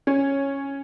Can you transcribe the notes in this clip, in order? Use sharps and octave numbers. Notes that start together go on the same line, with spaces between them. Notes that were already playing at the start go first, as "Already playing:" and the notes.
C#4